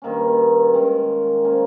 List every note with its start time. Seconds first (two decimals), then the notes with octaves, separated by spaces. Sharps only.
0.02 G2 D#3 A#3 C#4
0.73 D#3 G#3 C#4
1.44 F3 A#3 C#4